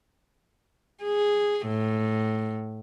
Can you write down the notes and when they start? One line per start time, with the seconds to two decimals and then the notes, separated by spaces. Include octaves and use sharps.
1.03 G#4
1.67 A2